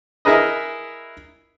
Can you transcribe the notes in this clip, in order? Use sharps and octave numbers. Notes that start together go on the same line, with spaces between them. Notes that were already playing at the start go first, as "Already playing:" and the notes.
E4 G#4 A#4 B4 D#5